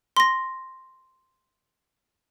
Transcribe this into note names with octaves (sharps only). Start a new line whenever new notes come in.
C6 A#6